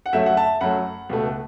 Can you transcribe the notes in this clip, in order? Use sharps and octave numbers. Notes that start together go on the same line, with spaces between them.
F#5
F#2 F#3 A3 E5
F#5
E5 A5
F#2 F#3 A3 F#5 B5
C#2 B2 A3